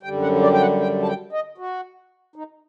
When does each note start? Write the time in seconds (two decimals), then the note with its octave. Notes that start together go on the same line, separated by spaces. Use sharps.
0.03 G3 G5
0.06 F#2 D3
0.22 F#5
0.42 D5
0.53 G5
0.61 F#5
0.80 G5
1.02 A5
1.06 G5
1.32 D#5
1.58 F#4
2.36 D#4